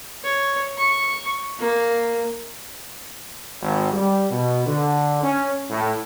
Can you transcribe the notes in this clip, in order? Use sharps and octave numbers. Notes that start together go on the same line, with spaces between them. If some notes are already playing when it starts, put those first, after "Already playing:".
C#5
C#6
A#3
G#1
G3
B2
D3
C#4
A2